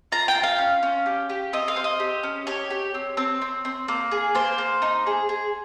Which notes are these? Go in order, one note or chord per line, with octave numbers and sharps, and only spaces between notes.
F4 A#5
G5
F4
F5
C#4
C#4
G4
G4
C4 D#5
F5
C4
D#5
G4
C#4
G4 C#5
G4
C4
C4
C4
C4
A#3
G#4
A#3 C5
A#3
D#4
G#4
G#4